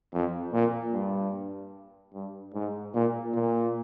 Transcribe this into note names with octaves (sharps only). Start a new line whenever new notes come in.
F2
A#2
G2
G2
G#2
A#2
A#2